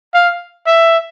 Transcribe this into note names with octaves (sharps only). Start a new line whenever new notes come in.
F5
E5